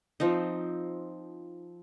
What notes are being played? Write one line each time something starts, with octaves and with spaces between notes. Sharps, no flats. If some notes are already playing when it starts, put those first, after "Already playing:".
F3 C4 D#4